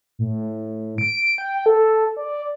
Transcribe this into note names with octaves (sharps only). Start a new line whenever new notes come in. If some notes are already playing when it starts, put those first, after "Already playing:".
A2
D7
G5
A4
D5